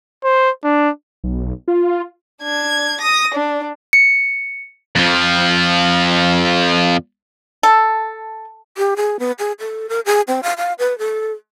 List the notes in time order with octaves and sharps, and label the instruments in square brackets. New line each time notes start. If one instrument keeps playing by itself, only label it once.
[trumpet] C5
D4
[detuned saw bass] B1
F4
[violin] D4 G#6
D#6 A#6
D4
[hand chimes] C#7
[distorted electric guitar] F2 F3
[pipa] A4
[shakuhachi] G4
G#4
B3
G#4
A4
A#4
G#4
C4
F5
F5
B4
A4